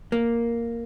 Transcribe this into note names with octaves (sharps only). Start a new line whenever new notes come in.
A#3